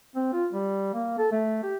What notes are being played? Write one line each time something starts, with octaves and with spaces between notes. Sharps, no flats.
C4
F4
G3
A#3
A4
A3
G4